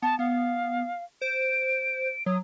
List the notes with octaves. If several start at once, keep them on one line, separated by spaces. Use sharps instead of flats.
B3 A5
B3 F5
C5 D7
F#3 D#6